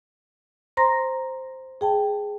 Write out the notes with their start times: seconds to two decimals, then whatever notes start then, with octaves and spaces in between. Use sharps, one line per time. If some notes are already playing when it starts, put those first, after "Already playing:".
0.77 C5 A#5 C6 A#6
1.81 G#4 G5 A5